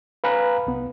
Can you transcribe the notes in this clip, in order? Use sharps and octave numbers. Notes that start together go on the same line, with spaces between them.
B4 F5 G#5 A#5 B5 F#6
C2 B3